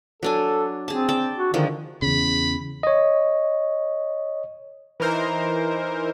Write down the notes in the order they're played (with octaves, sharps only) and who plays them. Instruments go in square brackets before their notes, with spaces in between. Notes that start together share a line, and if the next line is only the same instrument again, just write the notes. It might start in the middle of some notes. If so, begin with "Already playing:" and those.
[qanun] F#3 D4 G#5 [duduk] A4
[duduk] C4 [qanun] G#4 A5
[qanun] D5 G5 A5
[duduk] F#4
[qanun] D3 F3 G#3 [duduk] D#3
[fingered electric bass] E2 C#3 [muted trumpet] B5
[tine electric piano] C#5 D#5
[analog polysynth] E3 D#4 A#4 C5